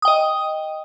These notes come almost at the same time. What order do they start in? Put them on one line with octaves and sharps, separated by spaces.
D#6 G5 D#5